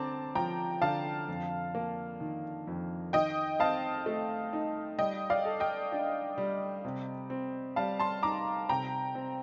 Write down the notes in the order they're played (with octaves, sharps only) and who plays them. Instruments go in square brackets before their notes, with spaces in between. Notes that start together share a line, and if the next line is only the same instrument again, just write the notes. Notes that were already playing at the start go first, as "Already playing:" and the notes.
Already playing: [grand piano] D3 C4 [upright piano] A5 A#5 D6
[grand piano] F3 [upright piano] G5 A#5
[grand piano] D3 [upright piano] F5 A5
[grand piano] F2
A#3
D#3
F2
[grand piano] D#3 [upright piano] D#5 G5
[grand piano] C4 [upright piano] F5 A5
[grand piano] A3
D#4
[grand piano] G3 [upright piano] D#5 G5
[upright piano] D5 F5
[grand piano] A4
[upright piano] D#5 G5
[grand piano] D4
G3
C3
C4
[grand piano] G3 [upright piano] F5 A5
[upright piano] A5 C6
[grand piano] D#4 [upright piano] A#5 D6
[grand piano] C3 [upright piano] G5 A#5
[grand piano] C4